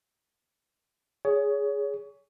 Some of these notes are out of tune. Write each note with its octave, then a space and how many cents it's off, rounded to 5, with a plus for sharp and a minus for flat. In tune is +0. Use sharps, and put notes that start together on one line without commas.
G#4 +0 C#5 +25